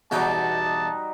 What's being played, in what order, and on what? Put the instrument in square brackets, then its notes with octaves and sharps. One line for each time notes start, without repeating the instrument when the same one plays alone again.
[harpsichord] E2 B2 G5 [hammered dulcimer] G3 D#4 F#4 [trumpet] A5